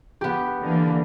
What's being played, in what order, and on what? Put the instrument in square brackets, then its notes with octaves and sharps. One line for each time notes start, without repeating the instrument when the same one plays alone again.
[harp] B3 G4
[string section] D3 E3 A#3